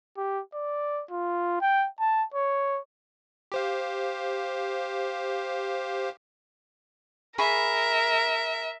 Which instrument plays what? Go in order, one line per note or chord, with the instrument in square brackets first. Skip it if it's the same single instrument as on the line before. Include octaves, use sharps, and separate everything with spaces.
[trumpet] G4
D5
F4
G5
A5
C#5
[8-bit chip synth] G4 C5 F5
[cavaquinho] G#4 B5 C#6 [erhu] A#4 [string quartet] E5